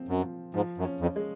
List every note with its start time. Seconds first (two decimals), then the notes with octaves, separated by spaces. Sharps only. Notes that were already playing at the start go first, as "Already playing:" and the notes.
Already playing: F3 C4
0.08 F#2
0.24 F3
0.54 G#2 F3
0.78 F#2
0.85 C#4
1.00 F2
1.16 G#3